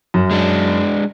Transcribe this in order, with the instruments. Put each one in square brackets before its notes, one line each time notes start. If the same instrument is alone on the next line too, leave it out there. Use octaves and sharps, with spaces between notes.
[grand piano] F#2
[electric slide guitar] G#3 D4